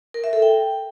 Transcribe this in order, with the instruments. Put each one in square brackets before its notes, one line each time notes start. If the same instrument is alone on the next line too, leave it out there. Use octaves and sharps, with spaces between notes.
[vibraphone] A#4
E5
A4
G5